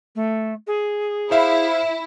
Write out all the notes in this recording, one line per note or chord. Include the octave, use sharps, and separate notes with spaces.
A3
G#4
E4 C5 E5 F5